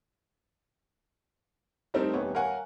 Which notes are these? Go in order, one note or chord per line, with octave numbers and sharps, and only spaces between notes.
G3 A3 C4 D#4 A4 A#4
D#1 B3 C#5
A#4 C#5 F5 F#5 G#5